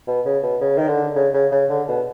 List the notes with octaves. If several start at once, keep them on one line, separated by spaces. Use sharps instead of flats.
B2
C#3
B2
C#3
D#3
D3
C#3
C#3
C#3
D3
B2